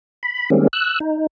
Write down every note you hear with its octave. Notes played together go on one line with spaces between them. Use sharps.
B5
D#3 G3 G#3 A#3 C4 C#4
E6 F#6
D#4